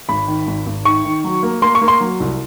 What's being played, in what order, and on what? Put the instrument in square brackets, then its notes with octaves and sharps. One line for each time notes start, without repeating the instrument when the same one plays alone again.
[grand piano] G#1 B5
D#3
G#1
G#1
D#3 C#6
D#3
F#3
A#3
A#3 C6
C#6
A#3
C6
F#3
C2